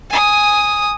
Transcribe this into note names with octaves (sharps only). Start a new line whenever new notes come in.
G#5 D#6